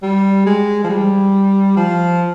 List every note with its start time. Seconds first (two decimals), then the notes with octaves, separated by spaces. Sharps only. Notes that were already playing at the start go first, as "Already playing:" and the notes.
0.03 G3
0.46 G#3
0.84 F3
0.90 G3
1.77 F3